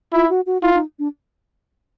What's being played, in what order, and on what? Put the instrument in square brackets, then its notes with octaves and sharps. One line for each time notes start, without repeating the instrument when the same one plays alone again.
[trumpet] E4 [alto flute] F4
[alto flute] F#4
F#4
[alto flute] E4 [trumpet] F4
[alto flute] D#4
D4